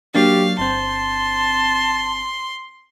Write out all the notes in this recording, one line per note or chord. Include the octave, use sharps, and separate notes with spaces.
F#3 A#3 D4 G4 F5
G1 C4 A5 C6